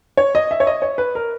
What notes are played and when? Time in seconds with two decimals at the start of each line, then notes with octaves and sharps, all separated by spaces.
0.17 C#5
0.35 D#5
0.51 E5
0.60 C#5
0.67 D#5
0.82 C#5
0.98 B4
1.15 A#4